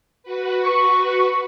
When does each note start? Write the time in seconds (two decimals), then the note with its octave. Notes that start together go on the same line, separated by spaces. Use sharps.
0.23 F#4 B4
0.65 C#6